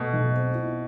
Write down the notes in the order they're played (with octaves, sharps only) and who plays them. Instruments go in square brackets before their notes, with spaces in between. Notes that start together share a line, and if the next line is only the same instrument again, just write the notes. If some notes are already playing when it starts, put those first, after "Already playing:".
Already playing: [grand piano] B2 [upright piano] A3
[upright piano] B1
C4
E4